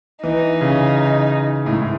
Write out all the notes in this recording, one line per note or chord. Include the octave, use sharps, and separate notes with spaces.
E3 D#4
C#3
A2
G#2